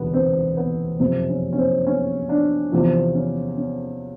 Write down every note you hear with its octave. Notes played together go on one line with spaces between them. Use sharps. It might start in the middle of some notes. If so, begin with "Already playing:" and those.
Already playing: E1 D2 C3 B3
C4
B3
F#1 F2 C3 C4
C#4
C#4
C4
C#4
D4
E2 C3 F3 C4
C#4
C#4